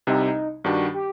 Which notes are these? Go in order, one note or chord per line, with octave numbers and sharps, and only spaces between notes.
C2 C3 G3 C4 D#4
G2 D#3 G3 D4 F#4
G4